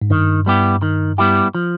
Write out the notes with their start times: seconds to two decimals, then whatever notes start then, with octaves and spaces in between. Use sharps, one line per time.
0.02 G#2
0.10 G2 D#3
0.46 G3 B3 E4 G4
0.82 D#3
1.18 G3 B3 E4 G4
1.55 F3